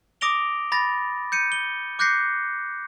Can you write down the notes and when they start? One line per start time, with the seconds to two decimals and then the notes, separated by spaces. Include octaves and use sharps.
0.21 D6 D#6 A#6 D7 F7 G7
0.72 B5 A6 A#6
1.32 G6 C#7 D#7
1.52 G7
1.99 D6 F#6 G6 A#6 C7 C#7